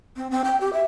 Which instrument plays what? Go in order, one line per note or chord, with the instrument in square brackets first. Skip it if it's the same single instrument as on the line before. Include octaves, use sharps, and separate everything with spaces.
[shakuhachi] C4
C4
G5
G4
E5